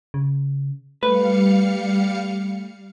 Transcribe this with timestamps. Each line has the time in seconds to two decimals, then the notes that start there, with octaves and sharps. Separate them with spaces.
0.14 C#3
1.03 G3 A3 B4 F5 C#7